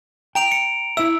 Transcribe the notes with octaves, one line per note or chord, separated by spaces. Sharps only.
G5 A#5 D7 F7
C#7
E4 E5 E6